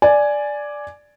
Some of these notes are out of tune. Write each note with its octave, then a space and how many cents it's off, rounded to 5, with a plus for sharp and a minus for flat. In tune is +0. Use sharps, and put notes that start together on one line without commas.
D5 +0 G#5 +5